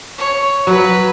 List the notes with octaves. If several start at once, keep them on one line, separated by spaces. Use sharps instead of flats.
C#5
F#3 B4